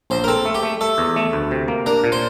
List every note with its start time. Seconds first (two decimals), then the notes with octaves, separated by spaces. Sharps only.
0.10 A#1 C5
0.24 A#4
0.28 C4 A4
0.45 A3
0.55 G4
0.63 A3
0.81 A3 A4
0.98 E2
1.16 A3
1.33 D2
1.51 C3
1.68 A#3
1.86 D4 A#4
2.04 A#2
2.12 C5